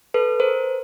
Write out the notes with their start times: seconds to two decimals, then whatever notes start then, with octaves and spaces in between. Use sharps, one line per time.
0.14 A4 B4
0.40 A#4 C5